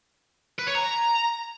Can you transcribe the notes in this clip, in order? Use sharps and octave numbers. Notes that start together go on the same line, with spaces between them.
B4
C#5
A#5